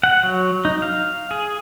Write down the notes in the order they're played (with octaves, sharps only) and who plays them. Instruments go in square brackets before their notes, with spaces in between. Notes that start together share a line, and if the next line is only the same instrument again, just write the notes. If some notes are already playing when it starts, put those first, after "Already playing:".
[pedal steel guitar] F#5
F#3
D#4
F5
G#4